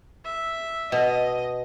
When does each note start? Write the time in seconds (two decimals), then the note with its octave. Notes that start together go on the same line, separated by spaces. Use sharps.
0.24 E5
0.92 B2 D#5